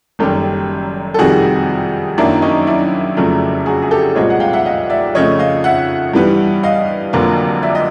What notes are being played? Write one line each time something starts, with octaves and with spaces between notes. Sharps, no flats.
F#1 F#2 D#3 G3 G4 A4
A4
F2 C3 D#3 G3 F#4 G#4
F#2 D#3 F#3 A#3 D4 E4
C#4 D#4
D4 E4
F1 F2 C#3 F#3 A3
F#4 G#4
G#4
G4 A4
C2 A#2 F3 G#3 C4 C#5 D#5
F#5
F5 G5
E5 F#5
D#5 F5
D5 E5
F2 C#3 F3 A3 C#4 C#5 D#5
D#5 F5
E5 F#5
G2 E3 G3 B3
D#5 F5
F1 F2 D3 F#3 A#3
D5 E5
D#5